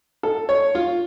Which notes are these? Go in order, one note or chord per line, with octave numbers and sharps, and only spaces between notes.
A4
C#5
F4